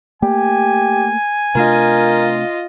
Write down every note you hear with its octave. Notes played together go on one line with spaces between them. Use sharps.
A3 A#3 G4 G#5
C3 A3 D4 F4 A#4 D#5